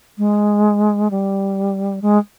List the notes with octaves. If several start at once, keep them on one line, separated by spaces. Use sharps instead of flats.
G#3
G3
G#3